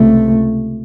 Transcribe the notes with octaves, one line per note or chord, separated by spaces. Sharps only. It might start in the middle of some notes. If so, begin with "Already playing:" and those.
Already playing: C#2 C3 A3